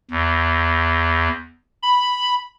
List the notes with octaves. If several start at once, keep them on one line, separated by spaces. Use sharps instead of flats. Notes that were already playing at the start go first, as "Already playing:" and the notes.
E2
B5